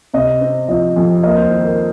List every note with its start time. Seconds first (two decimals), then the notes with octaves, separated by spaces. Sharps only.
0.14 C3 D#5
0.41 C4
0.69 F3 D#5
0.96 F2
1.23 A#3 D#5
1.37 C5
1.51 D#3
1.64 A#4